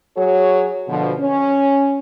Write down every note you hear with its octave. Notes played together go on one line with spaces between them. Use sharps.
F#3 F#4 G#4 C#5
B2 D3 F3
C#4